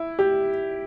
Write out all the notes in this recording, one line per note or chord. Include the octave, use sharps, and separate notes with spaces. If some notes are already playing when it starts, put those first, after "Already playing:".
Already playing: E4
G4